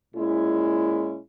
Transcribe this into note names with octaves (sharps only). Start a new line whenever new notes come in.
A#2 G#3 C#4 E4